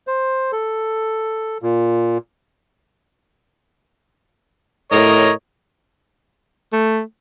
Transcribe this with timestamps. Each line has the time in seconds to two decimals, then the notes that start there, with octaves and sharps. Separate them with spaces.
0.07 C5
0.52 A4
1.62 A#2
4.92 A2 A#4 C#5 D#5
6.73 A3